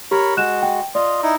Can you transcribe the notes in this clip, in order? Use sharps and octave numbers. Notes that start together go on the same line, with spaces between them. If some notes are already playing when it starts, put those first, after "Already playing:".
G4 A#4 C#5 B5
G#3 F#4 F#6 E7
G5
F4 D5 D#5
D#4 E4